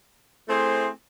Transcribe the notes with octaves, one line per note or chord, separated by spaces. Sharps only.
A3 C4 E4 G#4 C5